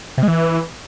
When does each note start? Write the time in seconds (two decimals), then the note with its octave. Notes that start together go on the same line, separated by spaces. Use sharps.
0.18 C3
0.23 G#3
0.28 E3